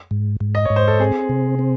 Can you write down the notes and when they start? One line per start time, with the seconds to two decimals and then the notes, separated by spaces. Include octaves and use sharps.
0.11 G#2
0.40 G#2
0.55 D#5
0.65 G#2 C#5
0.76 C5
0.88 A4
1.00 C4 G#4
1.29 C3
1.59 C4